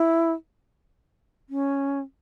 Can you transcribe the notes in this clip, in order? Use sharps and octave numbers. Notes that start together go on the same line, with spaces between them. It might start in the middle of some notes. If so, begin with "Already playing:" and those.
Already playing: E4
C#4